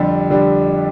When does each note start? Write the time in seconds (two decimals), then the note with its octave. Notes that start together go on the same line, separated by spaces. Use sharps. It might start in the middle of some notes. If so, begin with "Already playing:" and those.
Already playing: F2 D3 G3 D4 G4
0.30 D3 G3 D4 G4